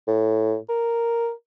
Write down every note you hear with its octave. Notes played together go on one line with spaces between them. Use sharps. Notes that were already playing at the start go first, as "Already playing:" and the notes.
A2
A#4